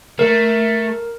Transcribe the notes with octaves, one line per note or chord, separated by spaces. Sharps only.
A3 A#4